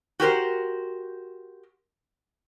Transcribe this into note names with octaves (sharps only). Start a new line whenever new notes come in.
F#4 G4 A#4 C5